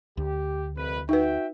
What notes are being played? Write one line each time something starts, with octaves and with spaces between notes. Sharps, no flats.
D2 G4
C2 F2 B4
D#4 F#4 B4 E5 G5